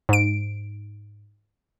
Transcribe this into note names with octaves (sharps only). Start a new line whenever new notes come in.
G#2 D7